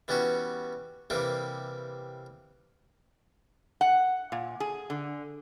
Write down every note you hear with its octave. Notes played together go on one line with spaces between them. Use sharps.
E3 G3 B3 C#4 F#4
C3 E3 G3 A#3
F#5
A#2
G#4
D3